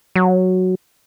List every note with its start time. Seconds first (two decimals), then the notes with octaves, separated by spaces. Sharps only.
0.16 F#3